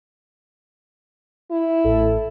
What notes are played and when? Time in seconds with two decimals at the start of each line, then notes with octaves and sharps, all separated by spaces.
1.51 E4
1.84 A1 A4